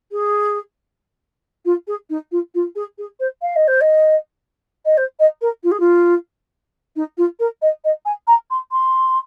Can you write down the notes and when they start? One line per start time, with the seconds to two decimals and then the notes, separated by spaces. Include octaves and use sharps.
0.12 G#4
1.65 F4
1.88 G#4
2.10 D#4
2.32 F4
2.55 F4
2.76 G#4
2.98 G#4
3.20 C5
3.42 F5
3.56 D#5
3.68 C5
3.81 D#5
4.85 D#5
4.97 C5
5.20 D#5
5.41 A#4
5.64 F4
5.71 G#4
5.80 F4
6.96 D#4
7.18 F4
7.40 A#4
7.62 D#5
7.85 D#5
8.05 G#5
8.27 A#5
8.51 C6
8.72 C6